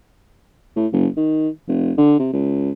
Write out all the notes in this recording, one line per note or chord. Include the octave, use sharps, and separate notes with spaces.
A2
F#1
D#3
F1
D3
C3
C#2